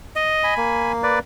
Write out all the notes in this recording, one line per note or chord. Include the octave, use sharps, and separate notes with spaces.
D#5
G#5 B5
A#3
B4 D5